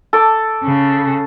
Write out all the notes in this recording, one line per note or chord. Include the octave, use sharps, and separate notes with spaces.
A4 D6
C#3